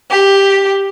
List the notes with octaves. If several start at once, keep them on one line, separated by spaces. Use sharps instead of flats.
G4